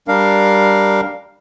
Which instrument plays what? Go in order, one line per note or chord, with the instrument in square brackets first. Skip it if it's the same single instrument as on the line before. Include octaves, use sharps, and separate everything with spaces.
[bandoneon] G3 D4 A#4 F5